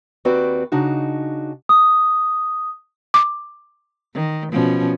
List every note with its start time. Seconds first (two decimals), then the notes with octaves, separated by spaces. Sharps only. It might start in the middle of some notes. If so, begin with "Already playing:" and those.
0.25 D#2 C4 F#4 B4 D5
0.72 C#3 D4 D#4 F#4
1.69 D#6
3.14 D6
4.14 D#3
4.52 B2 F3 C#4